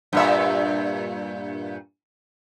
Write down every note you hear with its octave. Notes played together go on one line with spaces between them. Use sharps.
G2 A#2 E5